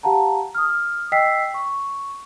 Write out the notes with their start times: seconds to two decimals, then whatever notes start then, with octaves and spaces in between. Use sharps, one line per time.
0.03 G4 F5 F#5 A5 A#5
0.55 D#6 F6
1.12 D#5 G5 E6 B6 C7
1.54 C#6